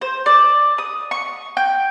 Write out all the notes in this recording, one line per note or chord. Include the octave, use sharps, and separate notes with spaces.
C5
D5
D#6
C#6
G5